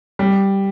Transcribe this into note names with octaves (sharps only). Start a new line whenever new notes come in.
G3